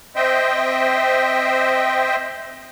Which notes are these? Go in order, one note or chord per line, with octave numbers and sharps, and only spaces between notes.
C4 C5 D#5 E5 G5